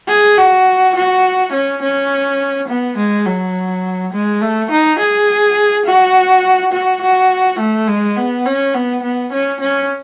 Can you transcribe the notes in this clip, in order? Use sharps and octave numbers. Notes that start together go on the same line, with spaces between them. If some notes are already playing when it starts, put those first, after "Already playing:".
G#4
F#4
F#4
C#4
C#4
B3
G#3
F#3
G#3
A3
D#4
G#4
F#4
F#4
F#4
A3
G#3
B3
C#4
B3
B3
C#4
C#4